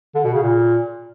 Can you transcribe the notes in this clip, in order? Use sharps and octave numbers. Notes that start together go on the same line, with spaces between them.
D3
B2
C#3
A#2